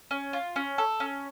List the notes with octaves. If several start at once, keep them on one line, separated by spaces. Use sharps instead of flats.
C#4
F4
C#4
A4
C#4